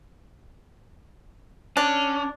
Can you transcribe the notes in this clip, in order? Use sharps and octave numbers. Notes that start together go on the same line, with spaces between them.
C#4 D4